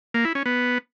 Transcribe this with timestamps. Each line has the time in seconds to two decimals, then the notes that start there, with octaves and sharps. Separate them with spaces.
0.14 A#3
0.25 E4
0.35 C#4
0.46 B3